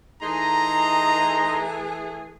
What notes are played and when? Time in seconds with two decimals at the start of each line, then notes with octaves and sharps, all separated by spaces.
0.22 E3 A3 D#4 G#4 D#5 A#5 C6